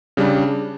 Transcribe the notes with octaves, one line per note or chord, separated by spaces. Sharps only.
C#3 G3 D4